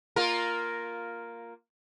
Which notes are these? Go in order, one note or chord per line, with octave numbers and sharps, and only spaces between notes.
A#3 F4 A#4